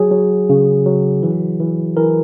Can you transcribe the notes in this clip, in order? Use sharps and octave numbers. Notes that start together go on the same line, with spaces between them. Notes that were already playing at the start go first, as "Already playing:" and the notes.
Already playing: F#3 G#4
F#3
C#3
F#3
E3
E3
E3 A#4